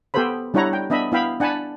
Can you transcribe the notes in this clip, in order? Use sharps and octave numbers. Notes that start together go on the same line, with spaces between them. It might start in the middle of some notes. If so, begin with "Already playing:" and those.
B3 G4 A4 B4 C5 B5
G3 D4 E4 C#5 F#5 A#5
G5
B3 D4 D#5 E5 B5
B3 E4 E5 F5 G5 B5
D4 F#5 G#5 A5 B5